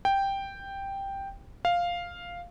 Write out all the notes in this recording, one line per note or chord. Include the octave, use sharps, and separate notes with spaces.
G5
F5